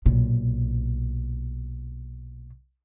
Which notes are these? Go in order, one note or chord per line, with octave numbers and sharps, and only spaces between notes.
B1 A#2